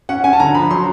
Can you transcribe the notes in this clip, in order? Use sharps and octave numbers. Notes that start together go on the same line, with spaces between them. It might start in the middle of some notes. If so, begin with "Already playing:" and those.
C#4 F#5
C#4 G#5
A5
D3 A#5
F3 B5
F#3 C6